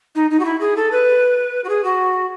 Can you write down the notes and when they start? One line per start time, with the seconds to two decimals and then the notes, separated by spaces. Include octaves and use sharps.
0.15 D#4
0.30 D#4
0.39 F#4
0.45 E4
0.60 G#4
0.77 A4
0.92 B4
1.64 F#4
1.69 G#4
1.84 F#4